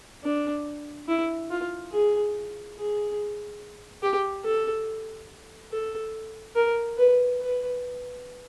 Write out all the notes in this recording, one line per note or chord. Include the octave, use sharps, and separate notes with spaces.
D4
E4
F4
G#4
G#4
G4
A4
A4
A#4
B4
B4